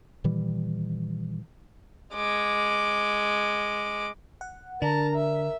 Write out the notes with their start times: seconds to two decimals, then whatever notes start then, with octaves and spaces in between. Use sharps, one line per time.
0.24 A#2 D#3 E3 G3
2.15 G#3 D6
4.41 F#5
4.82 D3 D4 A#4 A5 A#5
5.15 E5